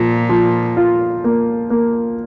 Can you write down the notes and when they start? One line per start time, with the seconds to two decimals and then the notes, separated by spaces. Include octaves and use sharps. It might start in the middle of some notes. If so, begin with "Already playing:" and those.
Already playing: A#2 F3
0.29 F3
0.77 F4
1.24 A#3
1.70 A#3